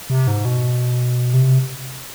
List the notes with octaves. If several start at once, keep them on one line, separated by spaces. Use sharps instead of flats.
C3
G#2
B2
C3